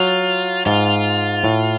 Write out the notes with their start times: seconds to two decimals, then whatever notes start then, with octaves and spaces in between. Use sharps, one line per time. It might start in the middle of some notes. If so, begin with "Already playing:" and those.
Already playing: F#3 F4
0.66 G#2 F4
1.44 A2